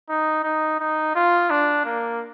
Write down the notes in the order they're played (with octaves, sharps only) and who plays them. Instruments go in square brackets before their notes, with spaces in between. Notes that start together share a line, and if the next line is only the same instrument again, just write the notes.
[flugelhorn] D#4
D#4
D#4
F4
D4
A#3